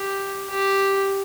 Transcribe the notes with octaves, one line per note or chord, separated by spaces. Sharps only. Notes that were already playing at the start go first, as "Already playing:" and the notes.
Already playing: G4
G4